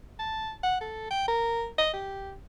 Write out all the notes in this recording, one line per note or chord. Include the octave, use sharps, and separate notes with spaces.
A5
F#5
A4
G5
A#4
D#5
G4